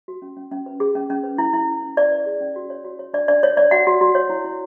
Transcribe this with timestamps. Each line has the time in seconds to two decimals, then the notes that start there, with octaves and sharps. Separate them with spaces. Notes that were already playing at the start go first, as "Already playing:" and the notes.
0.08 F#4
0.22 C#4
0.37 C#4
0.52 C#4
0.66 B4
0.80 G#4
0.95 C#4
1.10 C#4
1.24 B4
1.38 E4
1.53 E4
1.68 C#4
1.82 C#4
1.97 B4 D5
2.12 B4
2.26 G#4
2.41 C#4
2.56 F#4
2.70 C#5
2.85 F#4
2.99 C#5
3.14 D4 D5
3.28 D4 D5
3.43 C#5
3.57 C#5 D5
3.71 F#4 F#5
3.87 F#4
4.01 F#4
4.15 C#5
4.30 E4
4.45 E4